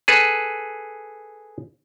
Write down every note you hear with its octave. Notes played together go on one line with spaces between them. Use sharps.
G#4 A4 B4